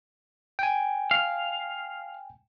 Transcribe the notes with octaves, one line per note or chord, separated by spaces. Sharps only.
G5 G#5
F5